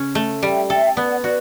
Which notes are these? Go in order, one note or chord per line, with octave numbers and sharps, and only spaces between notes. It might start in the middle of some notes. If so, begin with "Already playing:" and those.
Already playing: C#3 C#4
A3
G3 E5 G5
A4 E5 G5
G5
B3 D5 F#5
F#4 B4 D5